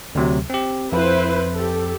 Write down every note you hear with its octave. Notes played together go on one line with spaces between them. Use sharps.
D2 C3 F#3
C4 G4
F2 E4 B4 C5
G4 A4